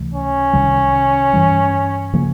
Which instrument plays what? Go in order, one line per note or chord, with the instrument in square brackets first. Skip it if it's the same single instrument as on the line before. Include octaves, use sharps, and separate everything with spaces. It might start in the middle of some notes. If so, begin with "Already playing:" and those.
Already playing: [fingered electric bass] C#2 C3 E3 A3
[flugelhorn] C#4
[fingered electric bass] C2 C3 D#3 G3
G2 E3 G3
C#3 F3 A#3